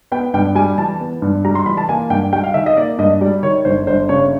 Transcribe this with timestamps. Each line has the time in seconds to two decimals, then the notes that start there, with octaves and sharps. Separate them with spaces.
0.12 B3 G5
0.34 G2 G5
0.55 G3 G#5
0.78 E3 A5
1.00 B3
1.22 G2
1.45 G3 A#5
1.55 C6
1.66 E3 B5
1.77 A5
1.89 A#3 G#5
2.10 G2 G5
2.33 G3 G5
2.44 F5
2.54 D#3 E5
2.66 D#5
2.77 A#3 D5
2.98 G2 D#5
3.21 G3 D5
3.43 D#3 C#5
3.65 G1 C5
3.87 G1 C5
4.09 C#3 C#5